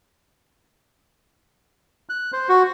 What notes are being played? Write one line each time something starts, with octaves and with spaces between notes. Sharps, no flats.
F#6
C5
F#4